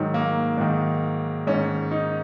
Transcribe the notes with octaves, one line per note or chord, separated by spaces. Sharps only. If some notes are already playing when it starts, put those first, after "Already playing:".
Already playing: G#2 D#3 F#3
A#3
G#2 D#3
G#2 D#3 C#4
D#4